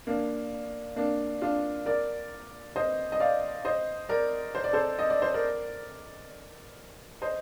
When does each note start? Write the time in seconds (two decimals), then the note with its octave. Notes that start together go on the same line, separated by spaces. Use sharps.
0.07 A#3 D4
0.96 A#3 D4
1.42 D4 F4
1.86 A#4 D5
2.76 C5 D#5
3.12 D#5
3.20 D5 F5
3.65 C5 D#5
4.09 A#4 D5
4.55 C5
4.64 D5
4.73 A4 C5
4.99 D#5
5.10 D5
5.22 C5
5.34 A#4 D5
7.22 C5 D#5